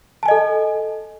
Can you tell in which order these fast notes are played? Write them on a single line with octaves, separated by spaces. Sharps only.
A5 G#5 D#5 A4